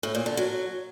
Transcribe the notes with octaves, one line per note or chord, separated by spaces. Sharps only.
A2
A#2
D3
F#3